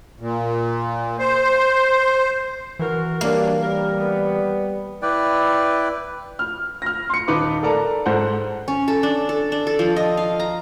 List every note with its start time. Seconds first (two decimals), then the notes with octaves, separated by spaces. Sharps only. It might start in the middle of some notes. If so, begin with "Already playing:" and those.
0.20 A#2
1.19 C5
2.79 E3 F#4 A#4
3.21 F#3 G3 A#3 D4
3.61 G3 A#4
3.97 B3
5.02 E4 B4 D5 G5
6.39 F6
6.82 F6 A#6
7.10 C6 C#7
7.28 D#1 D#4 B4 D6
7.63 A4 A#4 D5 A5 A#5
8.06 G#2 A4 C5 F#5
8.68 C#4
8.88 A4
9.03 D4
9.29 A4
9.52 D4
9.67 A4
9.79 F3
9.96 D#5
10.17 F5
10.40 A#5